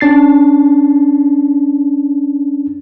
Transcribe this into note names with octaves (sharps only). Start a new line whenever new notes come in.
C#4 D4 A6 C7